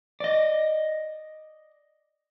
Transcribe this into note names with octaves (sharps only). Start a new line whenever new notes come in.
D5 D#5